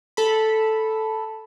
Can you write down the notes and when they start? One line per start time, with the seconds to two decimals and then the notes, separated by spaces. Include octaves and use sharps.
0.17 A4 B5